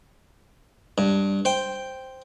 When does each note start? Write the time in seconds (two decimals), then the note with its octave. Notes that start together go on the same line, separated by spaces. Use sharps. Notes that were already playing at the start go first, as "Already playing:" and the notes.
0.98 G2
1.45 C5 G5